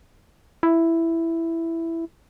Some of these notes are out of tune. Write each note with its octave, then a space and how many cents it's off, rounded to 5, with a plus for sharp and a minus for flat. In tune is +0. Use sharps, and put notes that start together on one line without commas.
E4 +5